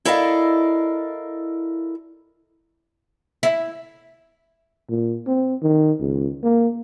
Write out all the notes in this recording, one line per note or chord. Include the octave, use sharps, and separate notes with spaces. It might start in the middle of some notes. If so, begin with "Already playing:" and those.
E4 A4 A#4 D5 D#5 F5
E4
A#2
C4
D#3
C#2
A#3